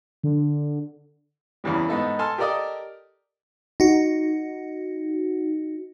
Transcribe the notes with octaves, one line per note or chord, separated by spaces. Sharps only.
D3
E2 C#3 E3 G3
G#2 B3 D#4 A4
A4 G#5 A5 C6 F6
G4 A4 A#4 D5 D#5 D#6
D#4 F#4